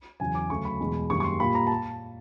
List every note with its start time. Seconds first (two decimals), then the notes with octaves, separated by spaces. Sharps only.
0.20 E2 C#3 F#3 G#5
0.35 D6
0.50 D2 C#3 F#3 A3 C#6
0.65 B5
0.80 E2 B2 G#3
1.10 F#2 D#3 G3 A#3 C#6
1.20 C#6
1.24 C6
1.40 A#2 G3 A#3 B5
1.55 A#5
1.67 A5